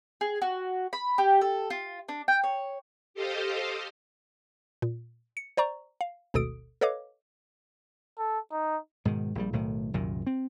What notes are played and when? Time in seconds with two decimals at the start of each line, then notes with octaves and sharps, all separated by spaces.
0.21 G#4
0.42 F#4
0.93 B5
1.18 G4
1.41 A4
1.70 F4
2.09 D4
2.28 G5
2.43 C#5
3.14 G4 A4 C5 D#5 F5
4.82 A#2
5.37 C#7
5.57 C5 D5 A#5 C#6
6.01 F5
6.34 G#1 D2 B2 A4 D#6 D7
6.81 A4 B4 C#5 D#5 F5 D6
8.19 A4
8.52 D#4
9.05 G#2 B2 D#3
9.35 A#1 A#2 D#3 G3
9.53 B1 A2 D#3
9.94 C2 F#2 A#2 D#3
10.27 C4